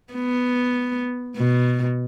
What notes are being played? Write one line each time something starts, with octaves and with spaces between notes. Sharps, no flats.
B3
B2